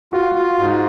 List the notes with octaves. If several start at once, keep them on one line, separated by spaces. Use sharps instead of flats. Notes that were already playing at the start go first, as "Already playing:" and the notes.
F4 F#4
F4
G#2